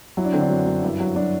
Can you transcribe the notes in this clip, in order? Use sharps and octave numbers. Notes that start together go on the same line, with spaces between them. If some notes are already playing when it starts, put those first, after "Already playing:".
F#3 E4
D4
D3 C4
D4
F#2
F#2
G2 E4
F#3
F#3 D4